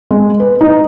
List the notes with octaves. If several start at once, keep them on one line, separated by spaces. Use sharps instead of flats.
G#3
B4
D#4